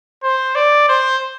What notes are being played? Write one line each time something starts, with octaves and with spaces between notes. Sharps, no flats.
C5
D5
C5